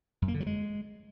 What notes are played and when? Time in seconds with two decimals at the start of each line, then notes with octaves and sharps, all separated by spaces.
0.22 F#2
0.28 A#3
0.34 D3
0.40 F#3
0.47 G#3